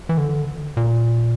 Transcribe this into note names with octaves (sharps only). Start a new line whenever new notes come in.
E3
D3
A#2